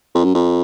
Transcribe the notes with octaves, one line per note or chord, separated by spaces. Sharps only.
F2
F#2
F2